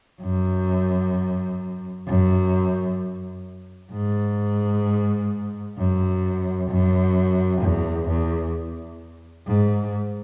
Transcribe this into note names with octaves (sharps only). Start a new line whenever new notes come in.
F#2
F#2
G#2
F#2
F#2
E2
E2
G#2